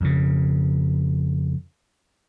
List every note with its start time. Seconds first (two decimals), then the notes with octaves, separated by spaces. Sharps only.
0.01 F2 C#3